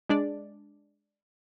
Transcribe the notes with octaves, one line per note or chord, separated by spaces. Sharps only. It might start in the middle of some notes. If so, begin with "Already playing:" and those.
G#3 D4 D5